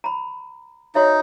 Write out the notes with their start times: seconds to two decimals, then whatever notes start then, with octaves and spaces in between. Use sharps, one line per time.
0.04 A#5 B5
0.95 D#4 F#4 C#5 E5